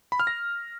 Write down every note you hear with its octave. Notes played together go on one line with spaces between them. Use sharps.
B5
F6
A#6